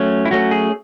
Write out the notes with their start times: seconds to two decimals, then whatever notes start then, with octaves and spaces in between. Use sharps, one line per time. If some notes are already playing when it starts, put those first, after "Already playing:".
Already playing: F#3 A3 C#4 C#5
0.25 E4
0.31 F#3 A3 C#4 F#4
0.51 G#4